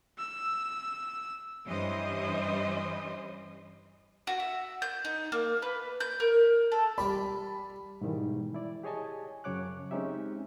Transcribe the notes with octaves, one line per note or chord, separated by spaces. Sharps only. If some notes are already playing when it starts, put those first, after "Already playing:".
E6
G2 E3 G3 C#4 C5 D#5
F#4
E5
G6
D#4
A#3
B4
G6
A#4
A4
G3 G4 D5 B5
G#2 B2 D#3 E3 G3
E4 D5
G4 G#4 C#5 D#5 G#5 A5
F#2 C#3 F#3 C#5 D6 F#6
G#3 C4 C#4 D#4 G4 E5